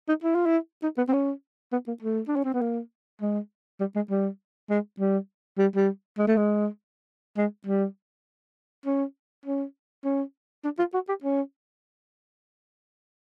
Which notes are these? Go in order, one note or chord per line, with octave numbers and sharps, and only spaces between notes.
D#4
E4
F4
E4
D#4
B3
C4
C#4
B3
A#3
A3
D4
C#4
C4
B3
A#3
G#3
G3
G#3
G3
G#3
G3
G3
G3
G#3
A3
G#3
G#3
G3
C#4
C#4
C#4
D4
F4
F#4
G4
C#4